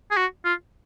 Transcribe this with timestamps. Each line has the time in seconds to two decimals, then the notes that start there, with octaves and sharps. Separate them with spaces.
0.11 G#4
0.17 F#4
0.45 F4